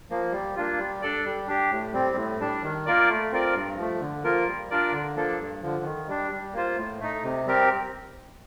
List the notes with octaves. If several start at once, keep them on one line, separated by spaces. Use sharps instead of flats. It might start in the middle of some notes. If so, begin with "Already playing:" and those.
F3 A#3
G3
A#3 D4 F4
G3
D4 A4 D5
G3
D4 G4
A2
G3 C4
A2
G3 D4
D#3
A#3 F4 A#4 D5
A3
C4 F4 A#4 D5
G2
F3 A3
D3
F3 A#3 F4 A#4
G3
D4 F4 A#4 D5
D3
F3 A#3 D4 A4
G2
D3 F3
D#3
G3 D4
G3
A#3 F4 C5
A2
A3 D#4
C3
G3 C4 G4 A#4